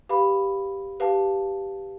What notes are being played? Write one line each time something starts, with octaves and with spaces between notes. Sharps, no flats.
G4 B4 F5 B5
G4 B4 F5 A5